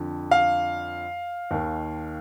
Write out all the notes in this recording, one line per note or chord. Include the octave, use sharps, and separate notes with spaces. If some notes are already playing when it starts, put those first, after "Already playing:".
Already playing: F2 D3 F3
F5
D#2 D#3